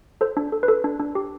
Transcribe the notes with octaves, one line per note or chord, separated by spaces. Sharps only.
A4 C5
D4
A4
B4
A4
D4
D4
G4